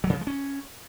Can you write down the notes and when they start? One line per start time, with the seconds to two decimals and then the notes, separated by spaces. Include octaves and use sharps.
0.04 F#3
0.10 C#3
0.15 F3
0.21 G#3
0.27 C#4